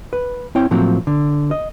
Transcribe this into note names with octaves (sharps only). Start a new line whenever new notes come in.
B4
C4 E4 C#5 G5
A2 F3 F#3 A#3 C4
D3
D#5